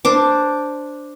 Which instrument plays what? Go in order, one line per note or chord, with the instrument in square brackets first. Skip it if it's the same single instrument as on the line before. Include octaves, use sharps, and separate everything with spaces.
[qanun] D4 C5 D6